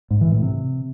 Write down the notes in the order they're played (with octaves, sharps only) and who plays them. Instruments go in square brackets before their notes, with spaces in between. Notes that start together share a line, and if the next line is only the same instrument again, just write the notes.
[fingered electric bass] G#2
E3
A2
C3